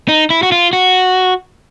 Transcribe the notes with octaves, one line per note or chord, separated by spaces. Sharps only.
D#4
E4
F#4
F4
F#4